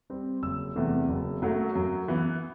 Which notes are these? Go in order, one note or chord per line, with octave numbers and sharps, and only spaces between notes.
G3 C4
F#1 E6
E2 C3 E3 A3
F#1
F#2 F#3 A3
F#2
E3 B3 E4